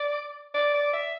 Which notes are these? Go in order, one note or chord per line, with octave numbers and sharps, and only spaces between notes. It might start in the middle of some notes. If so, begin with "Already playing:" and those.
Already playing: D5
D5
D5
E5